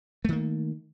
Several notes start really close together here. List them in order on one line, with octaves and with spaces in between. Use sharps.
A3 D#3 A#3